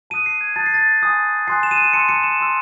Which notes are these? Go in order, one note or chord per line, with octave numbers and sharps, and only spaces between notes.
A5 D#6 F#6 D#7
C7
G#6
A5 D#6 F#6 A6
C7
A6
G#5 C6 D#6 F#6
G#5 C6 D#6 F#6 C7
E7
D#7
E7
A5 C6 E6 C#7
C#7
E7
A5 C6 E6